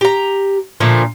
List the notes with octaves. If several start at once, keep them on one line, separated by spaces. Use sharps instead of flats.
G4 A#5
A#2 D3 F3 A3